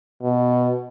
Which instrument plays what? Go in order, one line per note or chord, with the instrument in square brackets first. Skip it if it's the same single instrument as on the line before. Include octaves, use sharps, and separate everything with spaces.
[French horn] B2